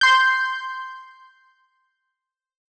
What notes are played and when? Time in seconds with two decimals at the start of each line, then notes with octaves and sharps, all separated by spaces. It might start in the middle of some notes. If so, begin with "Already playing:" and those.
0.01 C6 G6